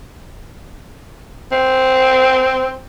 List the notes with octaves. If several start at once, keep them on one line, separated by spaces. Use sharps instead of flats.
C4